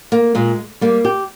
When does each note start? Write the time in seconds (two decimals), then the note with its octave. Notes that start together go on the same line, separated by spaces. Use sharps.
0.12 A#3
0.35 A#2 G#3
0.81 G3 A#3
1.05 G4